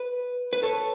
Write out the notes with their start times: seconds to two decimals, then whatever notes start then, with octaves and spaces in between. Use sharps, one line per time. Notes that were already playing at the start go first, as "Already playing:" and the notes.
Already playing: B4
0.53 B4
0.63 A4 C#5